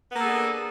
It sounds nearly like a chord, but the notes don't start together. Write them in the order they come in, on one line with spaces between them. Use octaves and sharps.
B3 A#3 A4 G#4 D4